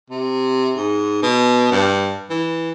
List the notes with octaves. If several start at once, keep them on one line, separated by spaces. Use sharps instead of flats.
C3
G#2
B2
G2
E3